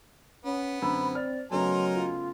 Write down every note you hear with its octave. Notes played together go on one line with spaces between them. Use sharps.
B3 C#4
F#2 D3 C4 B5 E6
D5 F6
C#3 F#3 A3 B3 D#4 A#4 G#5 C6
F4